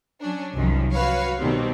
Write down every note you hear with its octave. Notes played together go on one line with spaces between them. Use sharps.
F#3 C#4 D4
C2 F#2 D#3 F3
F#4 B4 C#5 F5
B2 D#3 G3 C4